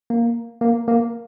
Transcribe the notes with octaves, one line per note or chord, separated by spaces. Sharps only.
A#3
A#3
A#3